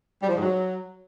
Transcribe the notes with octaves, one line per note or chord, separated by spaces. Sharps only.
G3
F3
G#2
F#3